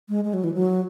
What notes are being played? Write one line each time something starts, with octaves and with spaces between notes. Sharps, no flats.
G#3
G#3
F#3
E3
F#3